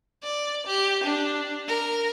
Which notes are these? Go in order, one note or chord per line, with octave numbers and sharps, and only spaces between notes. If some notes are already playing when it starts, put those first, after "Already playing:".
D5
G4
D4
A#4